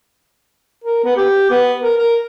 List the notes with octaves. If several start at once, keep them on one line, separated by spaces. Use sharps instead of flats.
A#4
B3
G4
B3
A#4
A#4